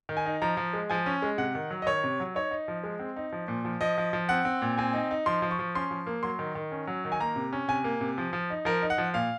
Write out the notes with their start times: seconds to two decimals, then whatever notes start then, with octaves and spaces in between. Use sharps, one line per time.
0.09 D#3
0.17 G#5
0.26 D#4
0.42 F3 A#5
0.57 F3
0.73 G#3
0.90 F3 G#5
1.06 C#4
1.22 G#3
1.38 C3 F#5
1.55 D#3
1.70 F#3
1.82 D#5
1.86 D#3 C#5
2.04 C3
2.20 F#3
2.35 D#4 C#5
2.51 D#4
2.68 F3
2.83 G#3
2.99 C4
3.16 D#4
3.32 F3
3.48 A#2
3.65 F3
3.81 F3 D#5
3.98 F3
4.13 F3
4.29 C4 F#5
4.45 C4
4.62 A#2
4.78 C4 G#5
4.93 D#4
5.11 D#4
5.26 F3 C6
5.42 F3
5.51 C#6
5.59 F3
5.75 C#4 C6
5.91 F3
6.07 A#3
6.23 F#3 C6
6.39 D#3
6.55 D#3
6.72 C#4
6.87 F#3
7.05 D#3
7.12 G#5
7.20 A#3 A#5
7.36 C3
7.53 C#4
7.68 C3 G#5
7.84 A#3
8.01 C3
8.18 F3
8.33 F3
8.50 D#4
8.65 F3 A#4
8.82 D#4
8.90 F#5
8.98 F3
9.14 A#2 F5